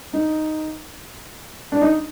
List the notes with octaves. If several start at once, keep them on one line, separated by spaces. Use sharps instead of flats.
D#4
D4
D#4